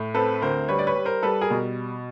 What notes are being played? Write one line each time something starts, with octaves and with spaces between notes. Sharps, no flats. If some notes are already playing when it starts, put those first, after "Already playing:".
Already playing: A2
C4 A4 B4
D2 A#4 C5
G3 B4 C#5
D5
B4 C#5
G3
A#4 C5
G3 A4 B4
G#4 A#4
B2